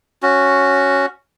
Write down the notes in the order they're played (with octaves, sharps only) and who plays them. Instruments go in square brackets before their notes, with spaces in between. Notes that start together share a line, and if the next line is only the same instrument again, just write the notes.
[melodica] C#4 F#4